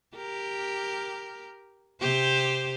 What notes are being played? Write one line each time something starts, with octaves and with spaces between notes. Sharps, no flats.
G4 A#4
C3 G4 C5